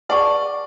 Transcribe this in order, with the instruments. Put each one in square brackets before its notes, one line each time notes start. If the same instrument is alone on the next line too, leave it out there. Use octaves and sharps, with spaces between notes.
[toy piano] G#4 B4 F#5 A5 C#6 [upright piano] D5